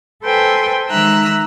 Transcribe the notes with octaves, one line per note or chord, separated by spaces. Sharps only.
A4 B4 C5 G5 G#5 C6
D#3 G#3 E5 A#5 E6 F#6